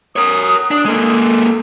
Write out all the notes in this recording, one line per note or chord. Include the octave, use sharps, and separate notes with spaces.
A#4 C#5 D#6
D4 D#6
G#3 A#3 A4